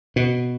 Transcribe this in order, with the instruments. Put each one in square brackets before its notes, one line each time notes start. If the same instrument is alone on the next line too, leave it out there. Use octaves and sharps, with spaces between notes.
[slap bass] B2